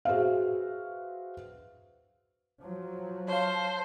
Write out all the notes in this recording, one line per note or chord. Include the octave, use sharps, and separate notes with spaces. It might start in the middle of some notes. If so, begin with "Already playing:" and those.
F#4 G#4 B4 C5 E5 F5
F3 F#3
C5 C#5 F5 A5